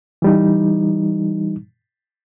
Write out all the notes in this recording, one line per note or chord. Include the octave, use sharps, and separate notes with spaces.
E3 G3 D#4